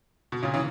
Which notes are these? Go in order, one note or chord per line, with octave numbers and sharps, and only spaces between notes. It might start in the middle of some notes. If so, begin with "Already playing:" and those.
B2
A#2 C#3
C#3 E3